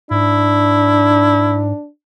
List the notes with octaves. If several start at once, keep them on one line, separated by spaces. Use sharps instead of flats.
G#2 D4 E4